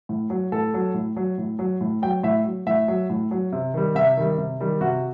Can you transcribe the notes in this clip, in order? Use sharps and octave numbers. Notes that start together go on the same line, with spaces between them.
A2
F#3
A2 A4
F#3
A2
F#3
A2
F#3
A2
F#3 G5
A2 E5
F#3
A2 E5
F#3
A2
F#3
C3
D#3 G3
C3 E5
D#3 G3
C3
D#3 G3
C3 F#4